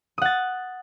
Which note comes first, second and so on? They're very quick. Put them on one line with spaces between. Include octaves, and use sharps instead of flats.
D#6 F#5 A6